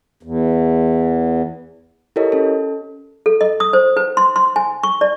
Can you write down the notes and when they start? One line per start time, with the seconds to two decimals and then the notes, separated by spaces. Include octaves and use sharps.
0.23 E2
2.16 E4 G4 A4 A#4 C#5 D#5
2.32 C#4 A4
3.26 A4
3.41 D#5
3.60 D#6
3.73 C5
3.97 B4
4.17 C6
4.36 C6
4.56 G#5
4.83 C#6
5.01 D5